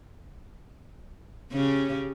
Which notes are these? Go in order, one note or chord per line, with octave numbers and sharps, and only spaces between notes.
C#3 C#4 G4